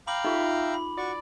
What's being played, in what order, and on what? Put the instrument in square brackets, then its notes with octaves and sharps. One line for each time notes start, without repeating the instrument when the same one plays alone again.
[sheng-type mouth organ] F5 G5 A#5 [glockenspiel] B5 D6 F#7
[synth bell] D#4 F4 [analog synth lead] E5
[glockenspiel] B5
[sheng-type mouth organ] F#4 C#6 [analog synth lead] D5